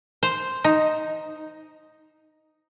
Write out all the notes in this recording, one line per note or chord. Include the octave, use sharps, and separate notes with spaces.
C5
D#4